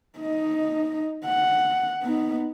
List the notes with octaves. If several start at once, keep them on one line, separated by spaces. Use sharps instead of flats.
D#4 D#5
F#5
B3 D#4